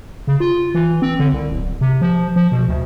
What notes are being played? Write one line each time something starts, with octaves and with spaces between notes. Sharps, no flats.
C#3
F4
E3
C4
D3
C2
D1
C3
F3
F3
B2
D2